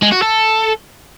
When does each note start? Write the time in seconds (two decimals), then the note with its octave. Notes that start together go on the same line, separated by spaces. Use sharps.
0.02 G#3
0.12 F#4
0.22 A4